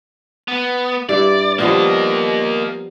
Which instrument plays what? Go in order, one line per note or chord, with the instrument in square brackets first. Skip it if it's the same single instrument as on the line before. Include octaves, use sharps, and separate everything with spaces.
[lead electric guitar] B3
[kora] G2 E4 [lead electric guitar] D5
[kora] F3 G3 B3 [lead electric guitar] A#3 D#5